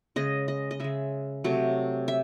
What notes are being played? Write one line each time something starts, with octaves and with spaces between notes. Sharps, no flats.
C#3 G#3 D#5
D#5
D#5
C#3 G#3 E5
C3 F#3 A3
E5